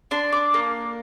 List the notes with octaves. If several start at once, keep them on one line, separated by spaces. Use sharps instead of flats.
D4 C6
D6
A#3